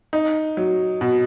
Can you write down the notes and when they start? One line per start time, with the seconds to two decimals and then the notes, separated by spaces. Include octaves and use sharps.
0.13 D#4
0.57 F#3
1.01 B2